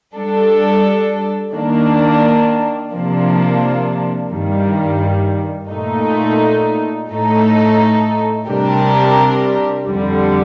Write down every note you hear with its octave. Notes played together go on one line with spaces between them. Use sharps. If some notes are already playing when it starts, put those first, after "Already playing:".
G3 D4 A4
D#3 A#3 D4
C3 F3 A#3 D4
G2 D#3 G3
A#2 A3 D#4
A2 A3 D#4 A4
C3 G3 D4 G4 A#4
F2 D3 G3